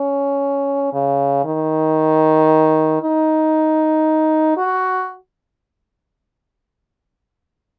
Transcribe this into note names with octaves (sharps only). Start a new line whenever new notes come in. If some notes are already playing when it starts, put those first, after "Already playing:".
Already playing: C#4
C#3
D#3
D#4
F#4